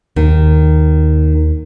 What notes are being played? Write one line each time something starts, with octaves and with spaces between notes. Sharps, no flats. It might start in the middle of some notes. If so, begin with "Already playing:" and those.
D#2 D#3